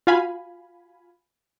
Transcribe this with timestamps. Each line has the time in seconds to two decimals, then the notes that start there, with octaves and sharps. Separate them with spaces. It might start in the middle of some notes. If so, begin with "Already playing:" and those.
0.07 F4 F#4 F5 G#5 B5